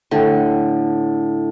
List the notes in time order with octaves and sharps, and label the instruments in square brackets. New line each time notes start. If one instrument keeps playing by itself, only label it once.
[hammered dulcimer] A2 A4 G5 [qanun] D3